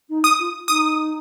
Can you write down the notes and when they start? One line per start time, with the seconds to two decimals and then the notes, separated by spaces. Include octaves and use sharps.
0.09 D#4
0.24 D#6
0.39 F4
0.68 D#4 D#6